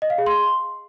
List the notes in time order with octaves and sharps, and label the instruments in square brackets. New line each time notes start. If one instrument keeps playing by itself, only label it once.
[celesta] D#5
F5
G#4
C6